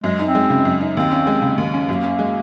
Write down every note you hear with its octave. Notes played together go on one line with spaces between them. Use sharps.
F#2 G#3
D#4
C4
G#3
C#3
F#2
D#4
D#2 C4
C#4
G#3
C#3
D#2
C#4
F#2 A#3
C#4
G#3